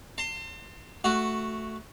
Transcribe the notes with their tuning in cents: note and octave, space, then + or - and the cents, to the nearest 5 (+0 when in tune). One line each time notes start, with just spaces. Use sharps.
A5 +45 C6 +0
A3 +0 F#4 +0 F#5 +0